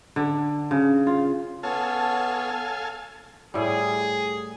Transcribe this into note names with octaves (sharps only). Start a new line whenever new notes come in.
D3
C#3
F4
B3 A4 C#5 F5 G#5 A5
A2 G3 G#4